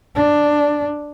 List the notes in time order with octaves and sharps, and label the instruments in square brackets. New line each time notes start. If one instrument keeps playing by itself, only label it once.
[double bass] D4